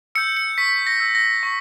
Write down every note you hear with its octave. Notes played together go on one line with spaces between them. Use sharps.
E6 G6 C#7
C#7
C#6 B6
A#6
E6 G6
A#6
C#6 B6